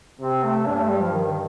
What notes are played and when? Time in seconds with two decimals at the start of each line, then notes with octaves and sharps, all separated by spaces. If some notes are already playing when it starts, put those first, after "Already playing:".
0.19 C3 C4
0.43 A3
0.65 G2 D4
0.78 A3
0.89 G3
1.01 F3
1.12 D#3
1.31 D#3